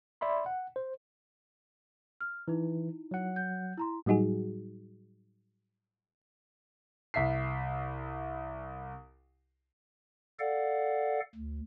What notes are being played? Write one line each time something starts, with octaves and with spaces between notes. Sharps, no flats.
D5 E5 B5 C6
F#5
C5
F6
E3 D#4 E4
F#3 F#5
G6
E4 A#5 C6
A2 F#3 G3 D#4 F#4 G#4
C2 E5 B6 C7
A4 D5 F5 F#5
D2